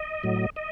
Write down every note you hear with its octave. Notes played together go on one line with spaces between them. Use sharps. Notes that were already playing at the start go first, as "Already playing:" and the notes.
Already playing: D#5
A2 F#3
D#5